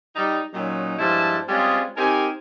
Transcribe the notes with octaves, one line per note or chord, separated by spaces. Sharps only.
G3 D#4
A#2 F#3 C#4 D#4
G2 F3 G#3 E4 C5 A5
G3 G#3 C4 C#4 F4 G#4
C4 D#4 G4 A#4 G#5